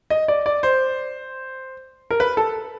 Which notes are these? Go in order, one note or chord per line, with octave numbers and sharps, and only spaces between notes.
D#5
D5
D5
C5
A#4
B4
A4